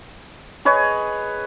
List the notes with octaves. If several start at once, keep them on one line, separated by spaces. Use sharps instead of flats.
G#4 B4 C#5 D#5